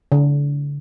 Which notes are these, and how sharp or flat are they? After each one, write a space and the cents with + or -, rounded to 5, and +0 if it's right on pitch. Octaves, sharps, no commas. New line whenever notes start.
D3 -35